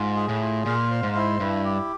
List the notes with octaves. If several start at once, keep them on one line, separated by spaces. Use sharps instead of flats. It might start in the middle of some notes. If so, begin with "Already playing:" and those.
Already playing: G#2 F4
G#4
A2
F4
A#2 F5
C5
G#2
E4
G2 E4
G4